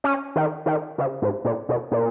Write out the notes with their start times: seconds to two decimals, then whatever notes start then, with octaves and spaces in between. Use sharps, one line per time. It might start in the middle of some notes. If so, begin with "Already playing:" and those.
0.04 C#4
0.36 D#3
0.66 D#3
0.98 C#3
1.22 G#2
1.45 A#2
1.69 B2
1.92 A#2